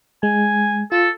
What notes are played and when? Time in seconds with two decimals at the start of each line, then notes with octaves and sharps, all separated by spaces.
0.23 G#3 G#5
0.92 F4 A4